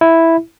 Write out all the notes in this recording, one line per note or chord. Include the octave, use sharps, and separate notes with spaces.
E4